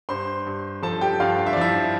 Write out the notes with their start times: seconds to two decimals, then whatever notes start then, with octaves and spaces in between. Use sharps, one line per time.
0.09 G2 C5 C6
0.46 G2
0.82 F3 A4 A5
1.01 G4 G5
1.20 G2 F4 F5
1.38 F5
1.46 E5
1.53 D5
1.57 F3 E4 E5